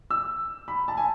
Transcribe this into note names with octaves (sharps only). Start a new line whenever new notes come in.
E6
B5
A5
G#5